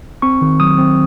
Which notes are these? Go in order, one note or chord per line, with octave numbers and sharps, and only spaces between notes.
C4 C#6
D#3
F#3 D#6
C4